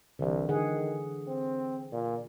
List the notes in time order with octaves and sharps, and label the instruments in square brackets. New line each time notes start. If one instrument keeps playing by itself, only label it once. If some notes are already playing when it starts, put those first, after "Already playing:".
[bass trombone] C2 [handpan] D3 E3
[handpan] D3 G#4 F#5 [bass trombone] D#3
[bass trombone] C4
A#2